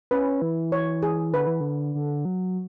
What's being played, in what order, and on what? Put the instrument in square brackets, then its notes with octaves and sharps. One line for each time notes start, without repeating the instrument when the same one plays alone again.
[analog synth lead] C#4 [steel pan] B4
[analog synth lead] E3
[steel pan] C#5
G#4
[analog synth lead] D3 [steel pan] B4
[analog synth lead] E3
D3
D3
F#3